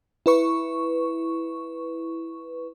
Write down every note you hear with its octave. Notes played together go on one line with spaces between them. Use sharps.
E4 B4 C#6